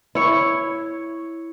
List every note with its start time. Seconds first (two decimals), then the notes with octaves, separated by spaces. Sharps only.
0.15 E4 C#5